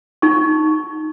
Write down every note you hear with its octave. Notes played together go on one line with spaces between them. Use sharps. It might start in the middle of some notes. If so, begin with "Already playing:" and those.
D#4 C#6